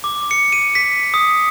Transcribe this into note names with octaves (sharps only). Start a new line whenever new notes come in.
D6
C#7
D#7
B6
D#6